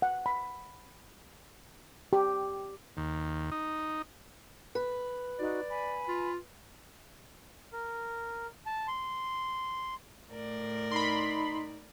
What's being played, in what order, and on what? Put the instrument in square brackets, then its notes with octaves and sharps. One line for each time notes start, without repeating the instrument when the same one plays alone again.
[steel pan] F#5
B5
G4
[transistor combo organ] D#2
D#4
[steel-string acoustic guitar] B4
[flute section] D#4 F#4 [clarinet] D5
[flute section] G#5 B5
[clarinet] F4
[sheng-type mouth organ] A#4
A5
C6
[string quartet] A2 A#4 D5
[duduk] D#4 [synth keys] B5 C6